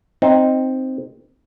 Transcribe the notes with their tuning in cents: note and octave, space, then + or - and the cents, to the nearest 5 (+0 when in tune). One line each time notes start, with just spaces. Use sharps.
C4 +0 D#4 +0